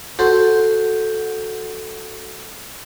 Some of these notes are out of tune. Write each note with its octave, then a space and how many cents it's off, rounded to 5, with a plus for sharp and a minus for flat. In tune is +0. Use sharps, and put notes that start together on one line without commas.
F#4 +0 A4 +0 C5 +0